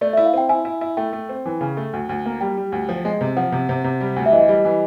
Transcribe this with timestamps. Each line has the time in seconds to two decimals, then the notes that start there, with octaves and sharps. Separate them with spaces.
0.01 A3 D5
0.13 E4 E5
0.25 F5
0.33 C4 G5
0.49 E4 G#5
0.65 E4
0.81 E4
0.97 A3 G5
1.13 A3
1.29 C4
1.46 E3
1.61 C#3
1.77 A3
1.93 D2
2.09 D2
2.26 A#3
2.41 G3 G5
2.57 G3
2.72 D2
2.89 F3
3.05 G#3
3.21 C3
3.37 F3 F#5
3.52 C3
3.69 C3
3.84 C3
4.01 G3
4.16 D2
4.26 E5
4.32 E3 D#5
4.48 G3
4.65 E3